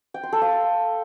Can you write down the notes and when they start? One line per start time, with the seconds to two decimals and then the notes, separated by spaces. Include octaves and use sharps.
0.14 G5
0.23 C6
0.32 A4
0.42 F5